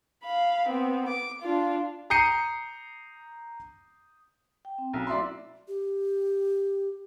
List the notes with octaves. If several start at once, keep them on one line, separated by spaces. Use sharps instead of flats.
F5 B5
B3 C4
D6
D4 F4
A#5 D#6 G6 C7 C#7 D#7
G5
C4
B1 C#4
A3 E4 F#4 D5 E5 C6
G4